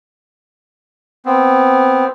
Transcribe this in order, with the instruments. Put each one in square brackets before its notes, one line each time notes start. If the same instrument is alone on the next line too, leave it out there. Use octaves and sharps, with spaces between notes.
[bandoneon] B3 C4